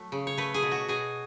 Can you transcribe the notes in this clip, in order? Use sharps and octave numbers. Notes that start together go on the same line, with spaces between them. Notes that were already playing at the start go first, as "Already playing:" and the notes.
Already playing: F#3 A3
C#3
C#5
A3 B4
G#4
B2
F#4
B2 G#4